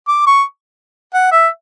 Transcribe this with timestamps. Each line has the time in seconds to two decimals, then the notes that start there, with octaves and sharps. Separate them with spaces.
0.08 D6
0.27 C#6
1.14 F#5
1.32 E5